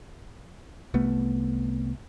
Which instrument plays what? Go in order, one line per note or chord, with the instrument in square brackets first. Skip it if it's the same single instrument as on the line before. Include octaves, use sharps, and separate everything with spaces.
[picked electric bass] C2 A3 B3